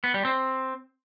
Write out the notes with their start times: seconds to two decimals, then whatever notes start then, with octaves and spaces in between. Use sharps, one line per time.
0.04 B3
0.14 G3
0.25 C4